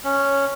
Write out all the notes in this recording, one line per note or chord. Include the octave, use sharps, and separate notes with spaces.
C#4